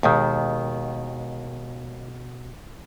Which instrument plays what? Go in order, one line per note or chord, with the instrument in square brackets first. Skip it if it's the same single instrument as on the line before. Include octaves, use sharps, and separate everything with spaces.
[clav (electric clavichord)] D#2 D#3 [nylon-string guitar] B2 G#3